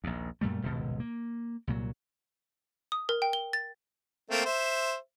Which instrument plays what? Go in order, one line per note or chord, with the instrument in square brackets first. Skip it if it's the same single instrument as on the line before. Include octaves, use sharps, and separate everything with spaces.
[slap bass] A#1 D#2
F#2 A#2 G3 A3
D#1 G#1 C#2 B2
A#3
C2 A#2 F#3
[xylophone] D#6
A#4
G5
G7
A6
[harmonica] A3 A#3 C4
C5 E5